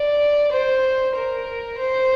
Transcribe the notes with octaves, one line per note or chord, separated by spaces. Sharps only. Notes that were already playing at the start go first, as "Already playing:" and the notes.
Already playing: D5
C5
A#4
C5